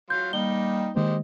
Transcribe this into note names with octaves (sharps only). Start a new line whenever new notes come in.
F#3 F5 C6 G6
G3 A#3 D#4 G5 G7
D#3 G#3 A#3 G4 C5 D#5